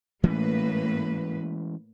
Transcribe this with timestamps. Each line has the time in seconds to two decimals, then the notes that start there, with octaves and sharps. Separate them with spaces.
0.23 A2 E3 G#3 A#3 C#4 B4